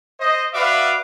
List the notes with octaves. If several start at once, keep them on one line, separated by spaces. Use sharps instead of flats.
C5 D#5
F#4 B4 D5 E5 F5 D6